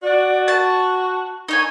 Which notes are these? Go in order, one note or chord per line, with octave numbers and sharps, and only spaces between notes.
F#4 D5
A5 C#6
D#4 C#5 G#5 C#6